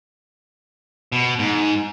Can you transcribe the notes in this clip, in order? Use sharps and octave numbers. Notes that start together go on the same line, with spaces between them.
B2
G#2